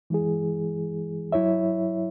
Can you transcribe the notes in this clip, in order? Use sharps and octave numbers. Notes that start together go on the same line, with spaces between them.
E3 G#3 E4 G#4
F#3 E4 C#5 E5